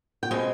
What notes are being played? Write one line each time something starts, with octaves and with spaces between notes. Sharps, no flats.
G5
B2 G#3 C4 G#5